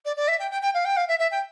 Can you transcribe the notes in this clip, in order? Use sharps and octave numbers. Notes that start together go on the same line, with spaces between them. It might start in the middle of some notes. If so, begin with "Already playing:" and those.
D5
D5
E5
G5
G5
G5
F5
G5
F5
E5
E5
G5